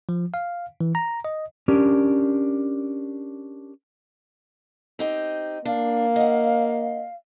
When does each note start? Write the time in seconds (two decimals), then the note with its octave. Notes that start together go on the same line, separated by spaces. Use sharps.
0.09 F3
0.34 F5
0.81 E3
0.95 A#5
1.25 D#5
1.68 C#4 D4 G4 A#4
4.99 C4 D#4 G4
5.65 A#3 D4 F5
6.16 D#5 F#5